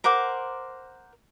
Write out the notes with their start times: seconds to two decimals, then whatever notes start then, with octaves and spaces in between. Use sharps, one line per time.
0.04 A#4 C5 F#5 D6